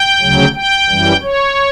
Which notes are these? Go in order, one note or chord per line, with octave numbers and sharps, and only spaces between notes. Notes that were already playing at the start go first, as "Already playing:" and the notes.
Already playing: G5
D2 C#3 F#3
G5
F#2 E3 G3
C#5